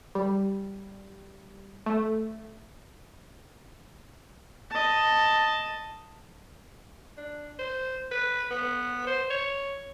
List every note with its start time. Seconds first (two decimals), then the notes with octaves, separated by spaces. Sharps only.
0.15 G3
1.86 A3
4.71 D#5 A5
7.17 D4
7.59 C5
8.11 B4
8.51 B3
9.07 C5
9.30 C#5